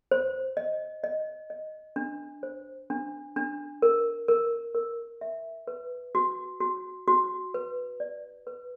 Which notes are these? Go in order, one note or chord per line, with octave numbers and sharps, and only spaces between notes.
C5
D#5
D#5
D#5
D4
C5
D4
D4
A#4
A#4
A#4
E5
B4
F#4
F#4
F#4
B4
D5
B4